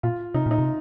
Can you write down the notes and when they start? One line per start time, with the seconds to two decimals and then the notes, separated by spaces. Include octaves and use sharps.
0.03 A#2 F4
0.34 C3 D#4
0.46 A#2 D#4
0.59 C3